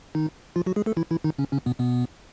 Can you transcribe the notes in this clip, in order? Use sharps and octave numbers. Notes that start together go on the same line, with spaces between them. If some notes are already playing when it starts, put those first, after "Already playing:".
D#3 D#4
F3 F4
F#3 F#4
G#3 G#4
A3 A4
E3 E4
E3 E4
D#3 D#4
C#3 C#4
C#3 C#4
B2 B3
B2 B3